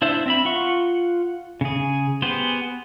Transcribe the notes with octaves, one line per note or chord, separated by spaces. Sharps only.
D4 E4 C5 E5
C4 E5 B5
F4 F#5 C#6
C#3 G#4
B3 G4 G#4 C5